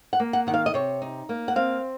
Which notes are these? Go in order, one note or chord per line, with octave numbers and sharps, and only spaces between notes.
F#5
A#3
F#5
D#3 F#5
F5
D#5
C3 C#5
D#4
A#3
F#5
C4 F5